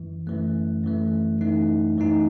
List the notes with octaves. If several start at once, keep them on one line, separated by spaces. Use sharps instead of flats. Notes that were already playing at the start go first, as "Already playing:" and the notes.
Already playing: F#2 E3
F#2 E3 A3
F#2 E3 A3
F#2 E3 A3 D#4
F#2 E3 A3 D#4